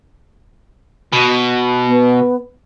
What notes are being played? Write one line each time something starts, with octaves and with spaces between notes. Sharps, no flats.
B2
B3